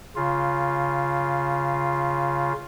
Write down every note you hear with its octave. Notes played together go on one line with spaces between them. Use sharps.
C#3 F4